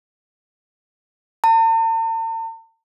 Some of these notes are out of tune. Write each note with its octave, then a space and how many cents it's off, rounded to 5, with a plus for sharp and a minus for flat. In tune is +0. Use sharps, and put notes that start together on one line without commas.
A5 +45